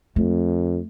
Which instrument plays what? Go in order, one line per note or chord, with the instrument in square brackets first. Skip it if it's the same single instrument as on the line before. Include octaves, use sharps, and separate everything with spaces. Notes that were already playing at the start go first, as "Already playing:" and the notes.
[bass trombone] F2 [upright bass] A3